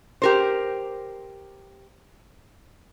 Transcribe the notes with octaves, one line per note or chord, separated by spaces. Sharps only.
G4 A#4 C5